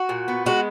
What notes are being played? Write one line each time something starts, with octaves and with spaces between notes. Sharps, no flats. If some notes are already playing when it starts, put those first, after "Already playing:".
Already playing: F#4
A#2
B3
G#3 F#4